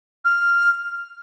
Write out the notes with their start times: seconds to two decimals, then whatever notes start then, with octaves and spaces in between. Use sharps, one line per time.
0.24 F6